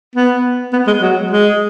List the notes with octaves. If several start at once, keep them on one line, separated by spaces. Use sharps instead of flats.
B3
B3
G#3
F#3
G#3